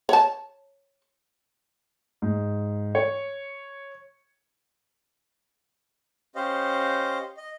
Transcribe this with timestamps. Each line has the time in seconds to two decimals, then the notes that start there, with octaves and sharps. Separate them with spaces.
0.09 C#5 A5
2.22 G#2
2.95 C#5
6.35 C#4 G4 C5 D#5 F5
7.37 D#5